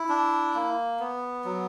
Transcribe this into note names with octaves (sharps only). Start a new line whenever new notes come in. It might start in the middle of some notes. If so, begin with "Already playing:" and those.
Already playing: E4
D4
A#3
B3
F#3